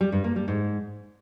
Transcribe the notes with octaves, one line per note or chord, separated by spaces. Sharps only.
G3
G2
A#3
G3
G#2